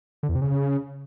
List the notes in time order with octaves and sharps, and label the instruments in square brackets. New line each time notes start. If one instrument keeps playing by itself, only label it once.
[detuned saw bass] D3
E2
C3
C#3